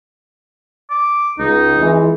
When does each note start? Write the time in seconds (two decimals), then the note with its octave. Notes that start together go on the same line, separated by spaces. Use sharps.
0.91 D6
1.39 C#2 D#4
1.78 F2 E3 G#3